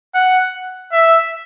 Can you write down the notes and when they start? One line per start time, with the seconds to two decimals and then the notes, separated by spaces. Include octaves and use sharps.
0.15 F#5
0.92 E5